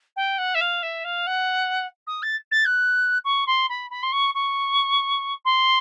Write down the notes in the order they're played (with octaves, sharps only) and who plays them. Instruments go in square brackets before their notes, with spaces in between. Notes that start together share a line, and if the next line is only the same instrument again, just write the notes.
[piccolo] G5
F#5
E5
F5
E5
F5
F#5
D#6
A6
A6
F#6
C#6
C6
B5
B5
C6
C#6
C#6
C6